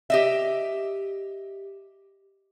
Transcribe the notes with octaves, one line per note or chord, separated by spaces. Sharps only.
G4 D#5 E5